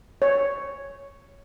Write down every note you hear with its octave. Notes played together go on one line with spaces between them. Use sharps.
C#5